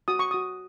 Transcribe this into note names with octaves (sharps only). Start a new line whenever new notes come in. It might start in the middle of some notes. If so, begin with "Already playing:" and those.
F#4 D#6
C#6
F#4 D#6